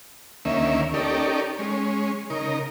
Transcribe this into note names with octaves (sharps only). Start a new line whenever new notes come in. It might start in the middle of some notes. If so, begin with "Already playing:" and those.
D2 D#3 A#3 C#4 E5
C#4 D#4 G4 A4 A#4 D5
G#3 C#4
C#3 D#4 A#4